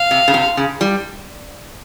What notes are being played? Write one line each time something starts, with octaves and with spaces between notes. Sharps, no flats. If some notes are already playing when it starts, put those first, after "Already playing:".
Already playing: F5
C3
C#3
C3
C#3
G3